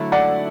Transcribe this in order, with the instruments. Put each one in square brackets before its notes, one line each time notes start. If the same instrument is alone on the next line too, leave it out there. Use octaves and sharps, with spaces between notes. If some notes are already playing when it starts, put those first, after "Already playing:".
Already playing: [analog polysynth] D3 F#3 A3 E4
[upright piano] D5 F#5